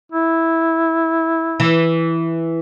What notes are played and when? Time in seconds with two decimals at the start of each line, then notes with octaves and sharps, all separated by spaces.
0.12 E4
1.60 E3